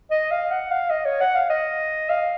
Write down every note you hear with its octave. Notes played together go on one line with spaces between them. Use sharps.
D#5
F5
F#5
F5
D#5
C#5
F#5
F5
D#5
F5